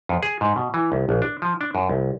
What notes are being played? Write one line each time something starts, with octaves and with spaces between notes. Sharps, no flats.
F2
G#4
G#2
B2
E3
C2
A#1
D4
F3
D4
F#2
C2